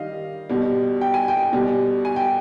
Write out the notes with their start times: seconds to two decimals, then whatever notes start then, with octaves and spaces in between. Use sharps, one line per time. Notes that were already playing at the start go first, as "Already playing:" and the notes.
Already playing: D#3 G3 D#5 F5
0.49 B2 G3
1.01 G5
1.14 G#5
1.28 G5
1.52 B2 G3
2.05 G#5
2.16 G5